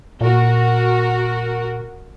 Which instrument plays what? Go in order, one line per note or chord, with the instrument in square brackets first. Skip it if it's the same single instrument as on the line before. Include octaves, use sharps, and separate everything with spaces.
[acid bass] A#2 [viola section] F#4 A#4